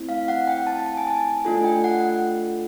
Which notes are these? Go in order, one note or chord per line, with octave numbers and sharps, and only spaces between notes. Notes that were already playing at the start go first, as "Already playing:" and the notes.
Already playing: A3 C4 E4
F5
F#5
G5
A5
A5
G#5
A5
A3 D4 F4 A4 G#5
G5
F#5